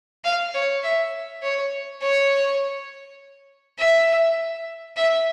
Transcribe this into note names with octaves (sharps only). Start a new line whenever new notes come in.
F5
C#5
E5
C#5
C#5
E5
E5